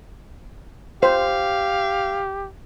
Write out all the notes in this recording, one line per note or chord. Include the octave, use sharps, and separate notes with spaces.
G4 C5 F5